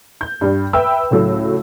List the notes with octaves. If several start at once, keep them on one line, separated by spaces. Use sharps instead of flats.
G6
G2 G3
B4 E5 G5 B5 E6
C#2 A2 F#3 A3